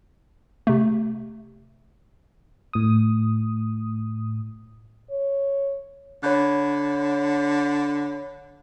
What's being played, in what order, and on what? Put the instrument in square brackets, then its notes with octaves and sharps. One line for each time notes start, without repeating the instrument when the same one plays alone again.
[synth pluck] C3 A3
[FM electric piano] A2 D#6
[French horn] C#5
[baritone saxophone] D3 [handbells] C#5 B5 F#6